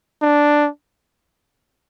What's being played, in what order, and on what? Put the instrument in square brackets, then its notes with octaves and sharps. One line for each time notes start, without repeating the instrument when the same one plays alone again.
[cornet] D4